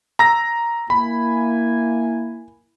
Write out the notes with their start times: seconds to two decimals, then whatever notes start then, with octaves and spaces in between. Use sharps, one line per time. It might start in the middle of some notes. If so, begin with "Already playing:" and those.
0.19 A#5 E6 A#6
0.90 A#3 E4 G#5 B5